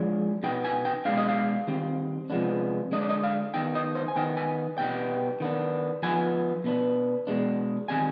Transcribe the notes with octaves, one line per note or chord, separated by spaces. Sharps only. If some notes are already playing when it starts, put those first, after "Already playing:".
Already playing: F3 G#3 D4
B2 B3 D#4 G5
G#5
G5
B2 G#3 D4 F5
D#5
F5
D#3 G3 C4
C3 F3 G#3 B3 D4
D3 G#3 D4 D#5
D5
D#5
F5
D#3 B3 D#4 G5
D#5
C5
G#5
D#3 B3 D#4 G5
G#5
B2 G3 B3 D#4 G5
D#3 B3 D4
F3 B3 D#4 G#5
B2 B3 D4
B2 G#3 D4
D#3 G3 C4 D#4 G#5